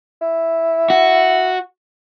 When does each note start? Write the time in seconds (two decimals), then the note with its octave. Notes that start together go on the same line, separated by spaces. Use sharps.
0.21 E4
0.90 F#4